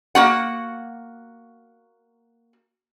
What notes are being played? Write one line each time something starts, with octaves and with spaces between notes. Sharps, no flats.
A#3 F#4 F#5